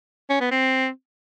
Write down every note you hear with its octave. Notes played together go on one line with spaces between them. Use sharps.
C#4
B3
C4